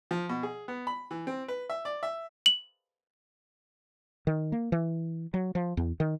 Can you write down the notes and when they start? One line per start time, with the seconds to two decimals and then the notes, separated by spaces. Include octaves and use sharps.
0.11 F3
0.29 B2
0.43 G#4
0.68 B3
0.87 B5
1.11 E3
1.27 C4
1.48 B4
1.70 E5
1.85 D5
2.03 E5
2.46 F#7
4.27 D#3
4.52 A#3
4.72 E3
5.34 F#3
5.55 F3
5.77 E2
6.00 D#3